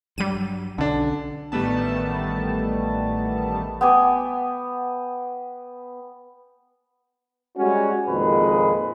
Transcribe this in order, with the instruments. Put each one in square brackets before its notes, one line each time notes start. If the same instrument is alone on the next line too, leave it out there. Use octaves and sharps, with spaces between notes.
[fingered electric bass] G2 F#3 [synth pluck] G3 D#7
[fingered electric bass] B1 C#4 [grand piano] D3 D4
[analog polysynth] A1 D#3 G3 A3 B3 A5
[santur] B3 G5 G#5 D6
[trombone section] G3 G#3 C#4 F#4
F2 A#2 D#3 G#3 B4